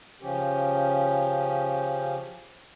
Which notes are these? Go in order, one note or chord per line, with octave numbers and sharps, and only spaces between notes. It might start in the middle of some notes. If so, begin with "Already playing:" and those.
C#3 F3 C#4 G4